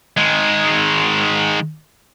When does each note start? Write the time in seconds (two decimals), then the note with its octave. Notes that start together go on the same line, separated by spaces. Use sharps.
0.17 D#3 G#3